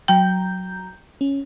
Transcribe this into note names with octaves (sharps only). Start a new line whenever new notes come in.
F#3 G5 A#5 G6
C#4